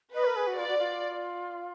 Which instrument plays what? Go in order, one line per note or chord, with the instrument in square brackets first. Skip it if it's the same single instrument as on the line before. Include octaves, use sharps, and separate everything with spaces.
[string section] B4 [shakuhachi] D#5
[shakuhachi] A#4
G#4
F#4
[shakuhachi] F4 [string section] D5
[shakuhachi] F#4
F4